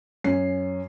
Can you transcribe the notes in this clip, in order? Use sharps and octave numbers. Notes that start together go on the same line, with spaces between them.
F#2 C#4 C7